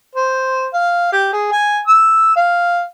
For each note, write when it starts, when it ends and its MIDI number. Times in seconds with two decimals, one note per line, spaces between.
0.15 0.67 72
0.74 1.10 77
1.12 1.30 67
1.33 1.49 68
1.52 1.80 80
1.88 2.35 88
2.36 2.85 77